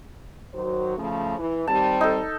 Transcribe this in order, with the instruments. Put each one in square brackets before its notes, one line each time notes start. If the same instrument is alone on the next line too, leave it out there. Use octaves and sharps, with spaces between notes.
[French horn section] D#3 F#3 C5
C#3 F3 A3
E3
[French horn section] D#3 G3 C4 [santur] A5
[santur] D#4 A4